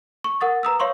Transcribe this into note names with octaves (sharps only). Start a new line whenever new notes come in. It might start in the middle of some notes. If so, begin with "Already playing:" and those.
C#6
A#4 F#5 D#6 A6
B4 A#5 D#6 E6
C#5 F5 C6 C#6